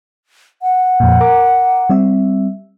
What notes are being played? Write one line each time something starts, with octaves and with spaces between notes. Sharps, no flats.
F#5
F2 A#2
A#4 A#5 D6
G3 C4 E5